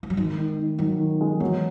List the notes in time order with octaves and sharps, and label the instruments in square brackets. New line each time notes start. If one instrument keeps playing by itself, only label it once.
[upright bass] E3
F#3
[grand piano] D#3 [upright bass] G#3
[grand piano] D#3
D#3
[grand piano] D#3 [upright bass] F#3
[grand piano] D#3
G#3
[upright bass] E3 [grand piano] F#3